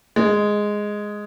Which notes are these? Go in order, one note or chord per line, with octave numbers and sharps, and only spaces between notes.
G#3